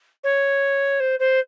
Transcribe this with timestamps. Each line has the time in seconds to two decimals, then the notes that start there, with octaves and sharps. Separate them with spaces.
0.24 C#5
1.00 C5
1.19 C5